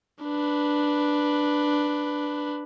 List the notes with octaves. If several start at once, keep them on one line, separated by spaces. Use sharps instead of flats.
D4 B4